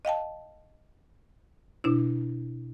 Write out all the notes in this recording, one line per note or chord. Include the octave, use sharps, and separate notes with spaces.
D#5 F5 G5 A5
B2 D4 E4